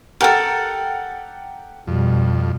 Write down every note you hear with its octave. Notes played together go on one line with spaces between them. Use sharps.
G4 A4 A#4 F#5 G5
F2 B2 G3